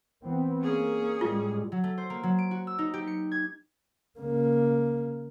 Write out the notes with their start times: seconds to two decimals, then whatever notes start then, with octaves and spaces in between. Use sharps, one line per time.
0.24 E3 B3 C4
0.62 A#3 C#4 G#4
1.21 A2 G3 G#3 F4
1.72 F#3
1.84 A3
1.98 C5
2.10 A#3
2.23 F#3
2.38 D7
2.51 F#4
2.67 E6
2.79 D#4
2.94 G4
3.07 C#7
3.32 G#6
4.19 C#3 A#3